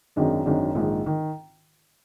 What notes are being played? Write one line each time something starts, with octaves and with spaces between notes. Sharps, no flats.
G#1 F#2 D#3 G#3 D4
G#1 F#2 D#3 G#3 D4
A#1 G#2 D#3
D#3